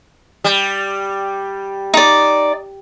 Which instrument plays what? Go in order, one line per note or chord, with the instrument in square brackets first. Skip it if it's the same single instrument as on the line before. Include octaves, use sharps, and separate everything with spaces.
[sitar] G3
[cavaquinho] D#4 D5